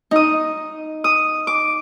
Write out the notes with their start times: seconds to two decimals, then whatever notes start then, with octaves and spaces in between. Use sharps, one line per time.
0.11 D#4 D#6
1.04 D#6
1.47 D6